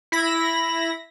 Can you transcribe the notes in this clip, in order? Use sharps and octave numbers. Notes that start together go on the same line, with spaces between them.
E4 B5 A#6